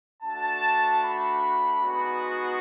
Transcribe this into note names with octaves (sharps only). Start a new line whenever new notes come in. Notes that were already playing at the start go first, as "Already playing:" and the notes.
A3 D4 F#4 A5
B5
G#3 B3 D#4 F#4
C6